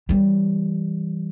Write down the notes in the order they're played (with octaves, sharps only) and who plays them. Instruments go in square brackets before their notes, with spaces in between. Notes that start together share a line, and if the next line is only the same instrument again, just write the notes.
[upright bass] E3 G3